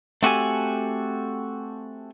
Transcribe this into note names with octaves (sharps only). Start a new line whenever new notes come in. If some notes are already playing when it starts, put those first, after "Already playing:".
A3 C4 F#4 G4 A4 G#5